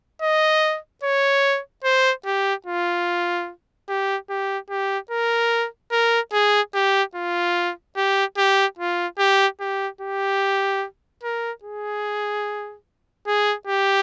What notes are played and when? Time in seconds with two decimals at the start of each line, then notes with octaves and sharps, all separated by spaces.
0.22 D#5
1.04 C#5
1.84 C5
2.26 G4
2.67 F4
3.89 G4
4.30 G4
4.70 G4
5.11 A#4
5.92 A#4
6.33 G#4
6.75 G4
7.15 F4
7.97 G4
8.38 G4
8.79 F4
9.19 G4
9.60 G4
10.01 G4
11.23 A#4
11.64 G#4
13.27 G#4
13.67 G4